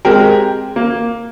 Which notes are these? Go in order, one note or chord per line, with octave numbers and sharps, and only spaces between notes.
G#3 C4 G4 A#4
A#3